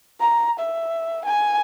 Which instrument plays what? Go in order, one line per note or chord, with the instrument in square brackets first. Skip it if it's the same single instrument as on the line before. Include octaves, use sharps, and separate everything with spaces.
[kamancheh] A#5
E5
G#5